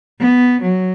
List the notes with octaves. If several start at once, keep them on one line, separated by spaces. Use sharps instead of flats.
B3
F#3